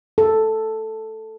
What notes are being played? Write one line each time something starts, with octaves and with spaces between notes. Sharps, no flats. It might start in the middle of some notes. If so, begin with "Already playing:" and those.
A4